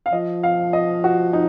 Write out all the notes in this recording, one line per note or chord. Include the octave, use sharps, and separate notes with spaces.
F5
F3 D#5
F5
D#5
F#4
D#4